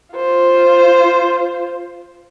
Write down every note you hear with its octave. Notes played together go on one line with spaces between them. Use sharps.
F4 C5